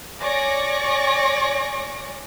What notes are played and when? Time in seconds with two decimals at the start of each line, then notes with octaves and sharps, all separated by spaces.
0.21 C#5 D5 G#5 C#6 D6 A#6